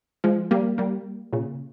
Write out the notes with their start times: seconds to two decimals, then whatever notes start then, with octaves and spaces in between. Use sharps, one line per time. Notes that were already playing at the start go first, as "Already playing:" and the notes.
0.24 F3 G#3
0.51 G3 A#3
0.78 G3 A#3
1.33 A#2 C#3